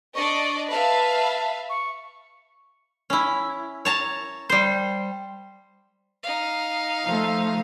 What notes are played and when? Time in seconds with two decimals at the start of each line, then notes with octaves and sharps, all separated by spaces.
0.15 D4 D5 D#5 C#6
0.71 B4 E5 F5 A5
1.69 C#6
3.10 C#4 E4
3.85 C#5 A5 A#5
4.49 G3 C5
6.23 D#4 F5
7.05 F3 A3